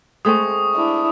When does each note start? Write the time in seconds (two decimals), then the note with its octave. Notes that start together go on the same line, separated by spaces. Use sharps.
0.25 G#3 A3 C4 C#6 D#6
0.75 D4 E4